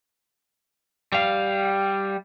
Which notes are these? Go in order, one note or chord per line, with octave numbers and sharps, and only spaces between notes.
G3 F5